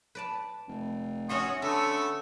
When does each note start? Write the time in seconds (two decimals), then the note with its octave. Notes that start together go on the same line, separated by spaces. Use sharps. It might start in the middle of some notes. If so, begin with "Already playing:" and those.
0.15 B4 D5 A5
0.68 F1
1.29 C#4 F#4 C#5 E5 C6 D#6
1.62 D3 A3 B3 A4 E5